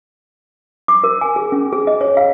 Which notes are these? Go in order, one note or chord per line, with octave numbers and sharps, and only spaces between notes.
D6
A#4
G#5
G#4
C#4
G#4
D#5
C#5
F5